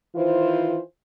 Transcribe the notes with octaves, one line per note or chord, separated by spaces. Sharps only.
D#3 E3 F4 C5